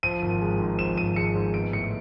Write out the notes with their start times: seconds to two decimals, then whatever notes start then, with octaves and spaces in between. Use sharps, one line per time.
0.03 F3 D#7
0.22 G#1
0.41 G#3
0.60 G#2
0.79 F3 E7
0.97 G#1 D#7
1.16 G#3 C#7
1.35 G#2
1.54 B3 D7
1.73 A2 C#7